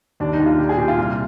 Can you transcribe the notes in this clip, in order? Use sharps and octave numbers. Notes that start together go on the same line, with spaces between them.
D#2 D4
D#4
D#2
F4
A#2 G4
G#4
A#2 G4
F4
C2